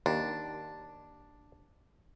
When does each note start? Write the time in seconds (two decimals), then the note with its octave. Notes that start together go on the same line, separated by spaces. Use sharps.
0.06 D#2 D4